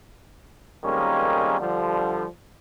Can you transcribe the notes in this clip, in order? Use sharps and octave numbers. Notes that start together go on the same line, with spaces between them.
F2 D#3 G3 G#3 A#3 C#4
D3 F3 G3